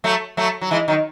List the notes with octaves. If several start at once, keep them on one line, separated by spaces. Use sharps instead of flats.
F#3 A3
F#3 A3
F#3
E3 G#3
D#3 F#3